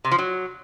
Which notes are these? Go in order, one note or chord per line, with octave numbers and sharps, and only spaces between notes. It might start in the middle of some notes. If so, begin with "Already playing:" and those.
C3
F3
F#3